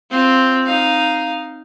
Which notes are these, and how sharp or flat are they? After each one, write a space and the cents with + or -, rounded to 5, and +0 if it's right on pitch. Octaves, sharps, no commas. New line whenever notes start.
C4 +0 F4 +0
D#4 +0 F5 +0